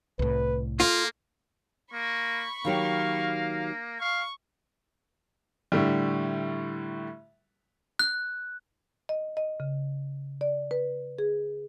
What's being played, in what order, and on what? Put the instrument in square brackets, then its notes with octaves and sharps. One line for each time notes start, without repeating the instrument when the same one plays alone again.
[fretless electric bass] C2 A2 [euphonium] B4
[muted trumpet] A#3 [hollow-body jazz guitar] F4 [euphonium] A4
[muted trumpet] A#3 [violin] B5 C#6
[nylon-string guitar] D#3 F#3 G4 [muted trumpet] A#3 [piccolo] F5
[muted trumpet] F5 [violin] C#6
[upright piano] A2 D3 G3
[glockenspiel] F#6
[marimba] D#5
D#5
C#3
D5
B4
G#4